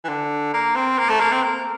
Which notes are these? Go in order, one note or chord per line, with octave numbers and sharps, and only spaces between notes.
E3
D3
A#3
C4
A#3
A3
A#3
C4
A#3